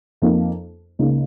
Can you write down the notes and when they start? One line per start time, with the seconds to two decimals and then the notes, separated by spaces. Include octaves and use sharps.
0.22 F2 F3 A#3 D#4
0.99 C#2 C#3 A#3 D#4